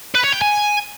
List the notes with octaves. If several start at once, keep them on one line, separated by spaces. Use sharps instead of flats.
B4
C#5
G5
G#5